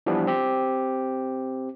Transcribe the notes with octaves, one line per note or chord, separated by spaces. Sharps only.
E3 F3 G3 B3 D4
C4 G4